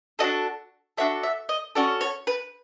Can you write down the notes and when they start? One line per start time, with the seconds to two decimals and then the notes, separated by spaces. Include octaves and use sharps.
0.19 D4 F#4 A4 D#5
0.97 D4 F#4 A4 E5
1.23 E5
1.49 D#5
1.75 C#4 F#4 A4 D5
2.01 C#5
2.27 B4